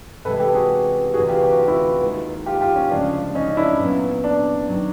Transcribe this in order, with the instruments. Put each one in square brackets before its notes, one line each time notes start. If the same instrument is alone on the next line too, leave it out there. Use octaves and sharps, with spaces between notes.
[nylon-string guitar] C3 E3 G#3 [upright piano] A4 B4
[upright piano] G4 A4
F#4 G#4
G4
[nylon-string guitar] D2 C3 E3 [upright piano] F#4 G#4
[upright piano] F4 G4
G4
F#4
F4
E4 F#4
[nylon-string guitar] D#2 D#3 G#3
[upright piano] F4 G4
F4 G4
C#4
[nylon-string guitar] D2 C#3 F3 G#3 [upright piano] D4
[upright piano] C#4 D#4
D4 E4
[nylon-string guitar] A#2 F#3 B3
[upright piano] D4
[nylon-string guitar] D#3 F#3